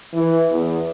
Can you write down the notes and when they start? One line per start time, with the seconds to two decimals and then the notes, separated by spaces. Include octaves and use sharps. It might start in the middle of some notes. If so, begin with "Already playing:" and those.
0.14 E3
0.51 E2